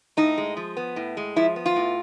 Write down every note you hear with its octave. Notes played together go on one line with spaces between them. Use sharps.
A2 D#4
G#3
F3
B3
A2
G#3
F3 E4
B3
F4
A2